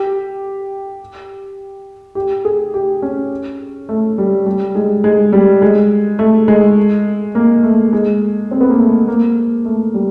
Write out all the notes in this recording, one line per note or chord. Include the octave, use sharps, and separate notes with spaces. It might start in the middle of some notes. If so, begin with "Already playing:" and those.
Already playing: G4
G4
G#4
G4
C#4
A3
G3
G3
G#3
G#3
G3
G#3
A3
G#3
A#3
A3
G#3
C4
B3
A#3
A3
A#3
A3
G3